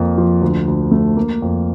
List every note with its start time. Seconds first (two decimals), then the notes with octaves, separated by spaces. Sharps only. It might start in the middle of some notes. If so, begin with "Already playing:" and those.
Already playing: F2 A#3
0.18 F3
0.42 D2
0.68 D2
0.91 A3
1.16 A#3
1.42 F2